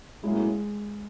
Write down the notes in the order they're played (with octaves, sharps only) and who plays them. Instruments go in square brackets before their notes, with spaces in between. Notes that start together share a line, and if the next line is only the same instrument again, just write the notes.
[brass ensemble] A2 F#3 A#3 C#4 E4 [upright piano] G#3